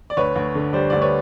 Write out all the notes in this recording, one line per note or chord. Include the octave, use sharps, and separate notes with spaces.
D5
D2 B4 C#5
D2
D3
G3 C5 D5
D2 D5
B4 C#5